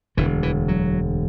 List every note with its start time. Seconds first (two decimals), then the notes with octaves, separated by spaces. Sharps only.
0.17 E1 D2 D3 E3
0.43 E3
0.68 F#3